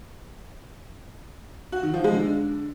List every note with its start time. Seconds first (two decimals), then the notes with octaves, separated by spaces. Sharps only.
1.72 F#4
1.83 D#3
1.94 F3
2.04 G#3
2.15 D3